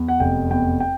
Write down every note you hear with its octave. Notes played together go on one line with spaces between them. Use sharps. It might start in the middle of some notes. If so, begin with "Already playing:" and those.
Already playing: E2
F#5
F1 G5
E2 G5
G5